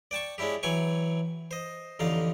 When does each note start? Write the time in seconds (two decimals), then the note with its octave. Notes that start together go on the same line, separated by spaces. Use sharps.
0.11 D5 G5 A5 C#6
0.38 G#3 C#4 D4 E4 G4
0.63 E3 F#3 G5 G#5 C#6
1.51 C5 D#5
1.99 A1 F2 D3 D#4 F5